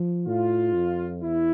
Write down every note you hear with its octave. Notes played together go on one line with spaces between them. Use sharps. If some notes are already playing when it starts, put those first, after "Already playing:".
Already playing: F3
A2 F4
F2
E2 E4